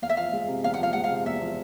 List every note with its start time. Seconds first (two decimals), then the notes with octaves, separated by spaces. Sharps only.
0.02 E2 F5
0.10 E5
0.17 F3 F5
0.33 G#3
0.48 C3
0.64 E2 F5
0.74 F#5
0.79 F3 F5
0.93 G#3 F#5
1.04 F5
1.10 C3
1.26 E2 E5
1.41 F3